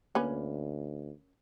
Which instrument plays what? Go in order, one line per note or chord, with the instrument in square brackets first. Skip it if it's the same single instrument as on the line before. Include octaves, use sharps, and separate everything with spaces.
[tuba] D2 [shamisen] A#3 C#4 B4